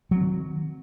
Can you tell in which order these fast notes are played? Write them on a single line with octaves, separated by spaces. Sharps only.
F#3 C4 D#3